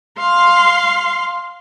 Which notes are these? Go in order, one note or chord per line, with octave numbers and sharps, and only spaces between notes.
F5 C6